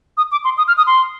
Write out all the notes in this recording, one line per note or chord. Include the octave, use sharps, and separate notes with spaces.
D#6
D6
C6
D#6
F6
D#6
C6